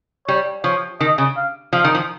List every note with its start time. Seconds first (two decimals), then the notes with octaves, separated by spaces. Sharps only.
0.28 G3 C#5
0.64 F3 C#5
1.00 D#3 D#5
1.18 C#3
1.37 F5
1.73 F3 F5
1.84 D#3
1.95 F3